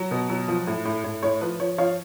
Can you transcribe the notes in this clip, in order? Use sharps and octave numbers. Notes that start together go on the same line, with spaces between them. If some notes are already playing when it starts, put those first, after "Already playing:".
Already playing: F#3
B2
F#3
F3
A2
A2
A2
A2 C#5
F3 B4
F3 C#5
F3 C#5 F5